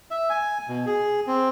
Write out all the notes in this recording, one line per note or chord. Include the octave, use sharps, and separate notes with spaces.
E5
G#5
B2
G#4
C4